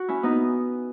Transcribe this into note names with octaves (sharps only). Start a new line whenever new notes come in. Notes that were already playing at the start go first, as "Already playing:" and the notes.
Already playing: F#4
C#4 E4
B3 D#4